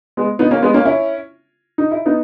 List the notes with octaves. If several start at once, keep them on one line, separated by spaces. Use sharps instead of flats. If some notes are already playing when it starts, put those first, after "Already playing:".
G#3 B3
B3 D#4
A#3 C#4
G#3 B3
A#3 C#4
C#4 E4
D#4
E4
B3 D#4